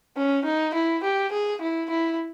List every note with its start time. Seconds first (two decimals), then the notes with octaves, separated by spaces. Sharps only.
0.17 C#4
0.45 D#4
0.74 E4
1.03 G4
1.32 G#4
1.61 E4
1.90 E4